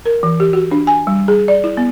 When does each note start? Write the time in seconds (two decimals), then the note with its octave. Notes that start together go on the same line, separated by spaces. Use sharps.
0.06 A#4
0.23 E3
0.40 G4
0.53 F#4
0.71 D4
0.87 G#5
1.07 G3
1.28 G#4
1.48 D5
1.64 E4
1.77 B3